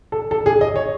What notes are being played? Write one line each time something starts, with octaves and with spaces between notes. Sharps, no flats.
A4
A4
G#4
D#5
C#5